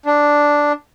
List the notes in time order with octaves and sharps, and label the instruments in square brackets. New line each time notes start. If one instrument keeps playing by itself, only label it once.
[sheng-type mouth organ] D4